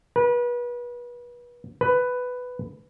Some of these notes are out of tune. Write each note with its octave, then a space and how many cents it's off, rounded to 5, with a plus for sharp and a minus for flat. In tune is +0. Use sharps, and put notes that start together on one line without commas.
B4 -30
B4 +10